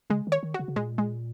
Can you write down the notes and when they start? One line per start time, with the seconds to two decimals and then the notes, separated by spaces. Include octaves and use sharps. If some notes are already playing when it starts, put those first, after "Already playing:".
0.10 C#3 G#3
0.27 D#3
0.32 C#5
0.43 D#3
0.54 C#3 F#4
0.68 C#3
0.76 A#2 G#3
0.98 G#3